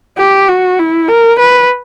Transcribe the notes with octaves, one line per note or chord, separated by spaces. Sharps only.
G4
F#4
E4
A#4
B4